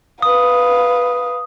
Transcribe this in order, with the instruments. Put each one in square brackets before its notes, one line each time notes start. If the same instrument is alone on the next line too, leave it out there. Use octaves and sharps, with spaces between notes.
[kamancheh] B4 F5 [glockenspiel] D#6